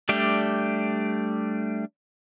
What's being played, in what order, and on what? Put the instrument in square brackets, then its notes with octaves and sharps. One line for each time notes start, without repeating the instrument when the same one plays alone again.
[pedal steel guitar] G3 A3 D4 G4